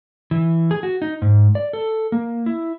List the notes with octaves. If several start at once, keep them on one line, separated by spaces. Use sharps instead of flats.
E3
G#4
F#4
D#4
G#2
D5
A4
A#3
E4